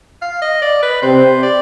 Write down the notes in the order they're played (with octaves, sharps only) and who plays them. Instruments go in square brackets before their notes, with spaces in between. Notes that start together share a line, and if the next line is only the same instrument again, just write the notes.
[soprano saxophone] F5
D#5
D5
B4
[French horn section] C3 [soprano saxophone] C5
[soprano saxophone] D5